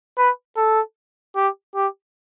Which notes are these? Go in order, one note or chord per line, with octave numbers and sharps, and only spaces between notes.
B4
A4
G4
G4